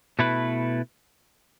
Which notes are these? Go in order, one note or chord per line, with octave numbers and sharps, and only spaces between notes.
B2 A3 E4 B4